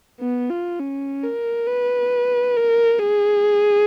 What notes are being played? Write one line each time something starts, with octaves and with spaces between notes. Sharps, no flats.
B3
F4
C#4
A#4
B4
A#4
G#4